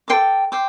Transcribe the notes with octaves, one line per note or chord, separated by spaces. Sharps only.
A4 C5 G5 D6
C5 G5 D6